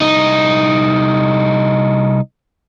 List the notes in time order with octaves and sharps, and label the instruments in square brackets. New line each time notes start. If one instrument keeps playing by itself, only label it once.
[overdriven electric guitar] C2 D#4